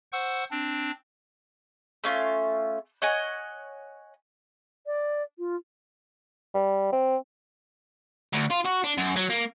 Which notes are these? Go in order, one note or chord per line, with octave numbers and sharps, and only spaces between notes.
C5 F#5 C#6 E6
C4 D4
A3 C#4 F4
C#5 D#5 F#5 G#5
D5
F4
G3
C4
D2
F4
F#4
D4
F#2
F#3
A#3